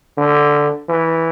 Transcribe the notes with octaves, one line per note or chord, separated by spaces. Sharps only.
D3
E3